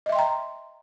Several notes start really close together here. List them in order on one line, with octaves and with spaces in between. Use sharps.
D#5 E5 C6 G5 A#5